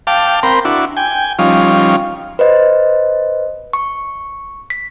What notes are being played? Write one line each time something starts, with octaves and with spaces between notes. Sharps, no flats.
F5 G5 A5 D6
C4 A#4 G5 B5 C6
D4 E4 F#4
G5 G#5
F3 G3 C#4 D#4 F4
B4 C5 D#5
C#6
B6